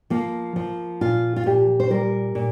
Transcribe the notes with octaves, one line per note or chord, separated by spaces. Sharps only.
F3 A#3
F3
A#2 F4
F4
A#2 G4
C5
G3 A#4
A#2